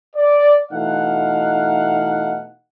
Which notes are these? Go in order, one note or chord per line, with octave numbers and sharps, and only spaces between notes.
D5
B2 E3 A3 D#4 F5 F#5